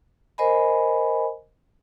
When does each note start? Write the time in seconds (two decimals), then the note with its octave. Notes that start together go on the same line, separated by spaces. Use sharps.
0.38 A#4 C5 D#5 G#5 B5